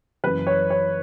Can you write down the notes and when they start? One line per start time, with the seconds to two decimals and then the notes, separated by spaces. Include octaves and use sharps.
0.24 F#1 F#2 E3 B4
0.47 C#5
0.70 C#5